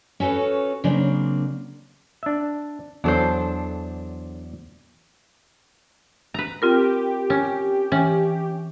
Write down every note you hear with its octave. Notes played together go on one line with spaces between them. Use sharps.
C#4 F#4 A4 B4 C#5
C#3 F#3 A#3 C4 D4
D4 E5
E2 F#3 D4 A4 C5
B4 A#5
C4 F4 G4 A#4
C#4
E3 C#4